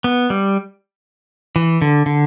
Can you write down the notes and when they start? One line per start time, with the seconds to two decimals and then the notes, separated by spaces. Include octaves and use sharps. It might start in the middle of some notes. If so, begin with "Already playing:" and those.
0.04 B3
0.30 G3
1.56 E3
1.82 D3
2.06 D3